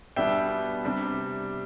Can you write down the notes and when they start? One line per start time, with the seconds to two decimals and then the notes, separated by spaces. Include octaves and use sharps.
0.16 B2 G3 B3 D4 E5 G5
0.85 C3 G3 D4